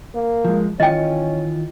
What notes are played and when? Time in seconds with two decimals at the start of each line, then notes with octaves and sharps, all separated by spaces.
0.15 A#3
0.45 F3 G#3
0.80 D#3 E3 C#4 F4 D#5 G5